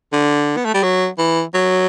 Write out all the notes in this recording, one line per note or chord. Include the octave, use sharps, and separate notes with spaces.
D3
B3
A3
G3
F#3
E3
F#3